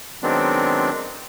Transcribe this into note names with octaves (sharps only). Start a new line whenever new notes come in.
D#3 F#3 G#3 B3 C4 D4